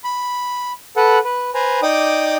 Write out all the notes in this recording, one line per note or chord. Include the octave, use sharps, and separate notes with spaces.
B5
A4 B4 F#5
B4
B4 C5 G#5 A#5
D#4 D5 G5 D6 D#6